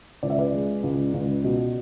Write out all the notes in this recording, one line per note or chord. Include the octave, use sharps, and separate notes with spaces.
C#2 D5
E5
B4 D5
G#3
C#2
C#2
B2